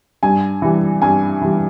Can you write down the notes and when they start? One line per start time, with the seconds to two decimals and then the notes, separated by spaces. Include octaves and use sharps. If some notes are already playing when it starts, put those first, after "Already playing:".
0.23 G2 G#5
0.62 E3 G3
1.02 G2 G#5
1.41 E3 G3